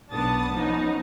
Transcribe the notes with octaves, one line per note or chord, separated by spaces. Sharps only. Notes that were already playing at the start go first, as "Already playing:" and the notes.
B1 B3 D4 A5 D#6 A6
F3 B3 C#4 D#4